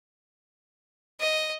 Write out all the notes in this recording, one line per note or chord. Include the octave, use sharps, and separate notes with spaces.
D#5